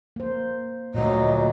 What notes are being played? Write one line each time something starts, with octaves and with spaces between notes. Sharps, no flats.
A#3 C5
D2 A#2 F#3 A#3 D#5